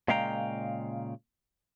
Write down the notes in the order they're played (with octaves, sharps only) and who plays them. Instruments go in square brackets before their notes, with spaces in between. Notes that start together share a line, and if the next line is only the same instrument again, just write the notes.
[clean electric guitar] A#2 C#3 G#3 F5 G5 A#5